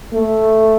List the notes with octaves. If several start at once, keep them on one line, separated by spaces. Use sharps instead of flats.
A3